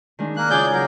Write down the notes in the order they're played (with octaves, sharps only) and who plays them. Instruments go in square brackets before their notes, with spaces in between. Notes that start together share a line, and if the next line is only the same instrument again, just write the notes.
[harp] D#3 G#3 D4
[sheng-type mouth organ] A#3 F#6
[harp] C#3 E4 F4 [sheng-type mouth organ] G#4 D5 G6
[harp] F#3 [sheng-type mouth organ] A#4